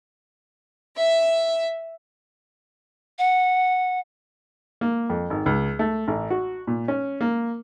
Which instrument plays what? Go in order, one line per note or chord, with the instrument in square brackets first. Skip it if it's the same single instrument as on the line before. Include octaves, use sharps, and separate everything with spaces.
[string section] E5
[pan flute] F#5
[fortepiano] A#3
F2
G#1
C#2
A3
A1
F#4
A#2
C#4
A#3